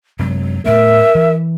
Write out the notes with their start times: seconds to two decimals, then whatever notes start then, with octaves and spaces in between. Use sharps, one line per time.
0.19 F#2 C3 F#3 G#3
0.66 A2 A3 B3 A#4 E5
1.15 E3